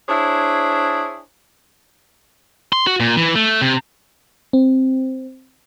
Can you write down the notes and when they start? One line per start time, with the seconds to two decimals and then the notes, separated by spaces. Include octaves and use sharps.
0.09 D4 E4 G#4 C5 C#5
2.73 C6
2.87 F#4
3.00 A#2
3.17 E3
3.35 A3
3.62 C3
4.53 C4